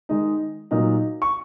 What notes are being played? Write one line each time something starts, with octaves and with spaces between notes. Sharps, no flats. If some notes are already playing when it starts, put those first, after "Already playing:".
D#3 G#3 D#4
A#2 F#3 D#4
C#6